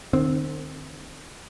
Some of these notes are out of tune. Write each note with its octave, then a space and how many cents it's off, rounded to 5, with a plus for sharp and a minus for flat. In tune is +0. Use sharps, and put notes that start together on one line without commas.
D#3 -45 C4 +0